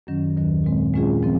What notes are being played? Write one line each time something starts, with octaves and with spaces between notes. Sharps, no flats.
F#2 D#3 F#3 C#4
D#2 D#3 F#3
A#2 G#3 C4
A#2 G#3 C#4 F4 G#4
F3 C4